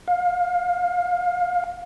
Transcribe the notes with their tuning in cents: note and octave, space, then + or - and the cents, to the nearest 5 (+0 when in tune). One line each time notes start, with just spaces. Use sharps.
F5 +25